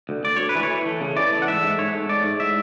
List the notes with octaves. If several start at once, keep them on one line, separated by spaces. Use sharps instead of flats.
D2
D2 D5
D2 C#5
B4
E3
C#5
E3
A3
C#3
E3 D5
A3
F#5
G#2 E5
G#2
G#2 C#5
A3
G#2 D5
G#2
A2 E5